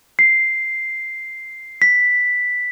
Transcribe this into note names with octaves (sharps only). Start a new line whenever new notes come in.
C7
B6